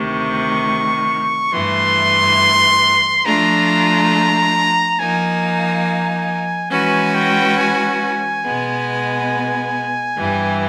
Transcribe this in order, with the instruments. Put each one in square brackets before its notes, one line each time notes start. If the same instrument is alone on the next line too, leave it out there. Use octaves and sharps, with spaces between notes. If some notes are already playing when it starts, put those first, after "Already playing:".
Already playing: [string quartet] D2 C3 D#3 [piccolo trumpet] C#6
[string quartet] G2 E3 A3 [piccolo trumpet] C6
[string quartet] F3 A3 D4 F4 [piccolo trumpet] A#5
[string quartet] F3 A#3 D#4 [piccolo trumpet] G#5
[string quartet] E3 G#3 C#4 F#4 B4 [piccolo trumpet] G#5
[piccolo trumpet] G5
G#5
[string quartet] B2 G#3 B3
G2 E3 G3